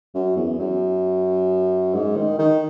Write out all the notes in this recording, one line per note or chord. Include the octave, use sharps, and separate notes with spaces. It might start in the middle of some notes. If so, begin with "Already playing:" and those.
F#2
E2
F#2
G#2
D#3
D#3